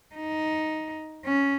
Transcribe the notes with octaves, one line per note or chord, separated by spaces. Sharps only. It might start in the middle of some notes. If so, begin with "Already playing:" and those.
D#4
C#4